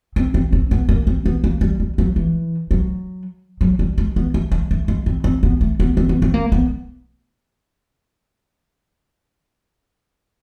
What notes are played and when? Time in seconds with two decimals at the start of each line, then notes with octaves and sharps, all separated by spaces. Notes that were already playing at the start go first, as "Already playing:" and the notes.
0.16 C4
0.34 C4
0.52 C4
0.71 B3
0.89 A#3
1.07 C4
1.26 B3
1.44 A#3
1.61 G3
1.80 G3
1.98 F#3
2.16 E3
2.71 F#3
3.61 F#3
3.79 G3
3.98 G#3
4.16 B3
4.34 A3
4.52 G#3
4.71 A3
4.88 G#3
5.06 C4
5.24 C4
5.43 B3
5.61 A3
5.80 B3
5.97 C4
6.09 B3
6.22 C4
6.34 A#3
6.52 B3